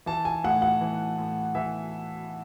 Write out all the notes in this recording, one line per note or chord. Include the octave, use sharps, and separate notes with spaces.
E3 A5
G#5
A2 F#5
F#5
E3
A2
E3 E5